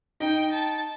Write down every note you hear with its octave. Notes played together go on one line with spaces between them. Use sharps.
D#4 G5
A5